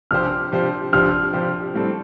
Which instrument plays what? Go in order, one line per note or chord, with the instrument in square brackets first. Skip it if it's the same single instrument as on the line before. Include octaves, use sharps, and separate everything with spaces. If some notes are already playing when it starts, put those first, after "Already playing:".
[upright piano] C3 F3 D4 G4 C5 [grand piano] F6
[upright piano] C3 F3 D4 G4 C5
[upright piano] C3 F3 D4 G4 C5 [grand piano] F6
[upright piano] C3 F3 D4 G4 C5
A2 G3 C4 A4